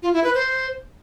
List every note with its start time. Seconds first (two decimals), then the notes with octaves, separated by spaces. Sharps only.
0.03 F4
0.13 E4
0.24 B4
0.34 C5